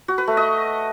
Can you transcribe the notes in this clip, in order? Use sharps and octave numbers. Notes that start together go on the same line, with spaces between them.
F#4
B4
A3
D#5